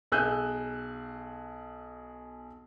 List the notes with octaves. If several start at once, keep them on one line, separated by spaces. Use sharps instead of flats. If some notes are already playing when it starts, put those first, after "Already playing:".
B1 G#4 E6 F#6 G6 D#7